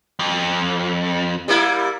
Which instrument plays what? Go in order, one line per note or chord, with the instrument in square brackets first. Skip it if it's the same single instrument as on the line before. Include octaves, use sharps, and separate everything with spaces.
[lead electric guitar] F2
[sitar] G3 A#3 E4